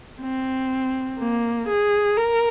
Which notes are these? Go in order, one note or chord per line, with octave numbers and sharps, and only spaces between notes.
C4
A#3
G#4
A#4